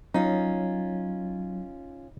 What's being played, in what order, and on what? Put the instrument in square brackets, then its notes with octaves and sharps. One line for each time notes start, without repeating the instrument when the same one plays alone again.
[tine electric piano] F#3 [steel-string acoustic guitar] C#4 F4 [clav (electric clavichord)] D#4